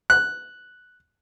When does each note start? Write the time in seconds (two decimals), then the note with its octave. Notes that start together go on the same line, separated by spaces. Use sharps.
0.10 F#6